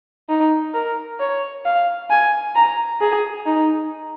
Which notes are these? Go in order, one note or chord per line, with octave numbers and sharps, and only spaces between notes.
D#4
A#4
C#5
F5
G#5
A#5
G#4
D#4